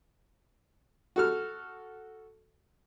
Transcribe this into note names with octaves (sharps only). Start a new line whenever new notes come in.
F#4 A4 F6